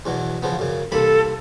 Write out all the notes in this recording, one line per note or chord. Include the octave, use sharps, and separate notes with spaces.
E2 B2 F#3
C#3 F3 B3
F#2 C#3
C2 A#3 A4 B5